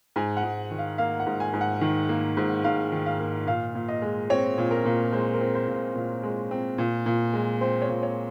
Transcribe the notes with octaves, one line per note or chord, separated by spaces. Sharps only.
G#2 G#5
F#5
G#2
D#3
F5
A#3 F5
F#5
G#2
G#5
G#2
F#5
D#3
A#3
G#2
G#2 F5
D#3
F5
A#3
A#2 F5
A#2
D#5
G#3
C4 C#5
A#2
A#4
A#2
G#3 C5
A#4
C4
C5
A#2
C5
A#2
G#3
C4
A#2
A#2
G#3
C4 C5
C#5
A#2
C#5